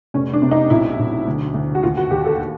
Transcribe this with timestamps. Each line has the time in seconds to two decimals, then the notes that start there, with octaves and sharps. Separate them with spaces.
0.14 F1 C#4
0.33 D4
0.42 C3
0.51 D#4
0.70 B1 E4
0.99 B1
1.27 D2
1.54 D2
1.75 F#4
1.83 D#2 F4
1.97 F#4
2.11 D#2 G4
2.25 A4